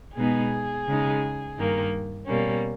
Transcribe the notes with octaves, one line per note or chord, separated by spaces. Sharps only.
B2 G#3 B3 D#4 G#4
C#3 G#3 D#4
G2 D#3 A#3
B2 G3 A#3 C#4